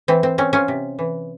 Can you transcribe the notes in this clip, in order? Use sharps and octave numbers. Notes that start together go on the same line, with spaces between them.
E3 C4
C4
C4 C#4
C#4 F4
C3
E3